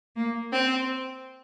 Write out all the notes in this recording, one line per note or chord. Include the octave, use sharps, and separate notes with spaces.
A#3
C4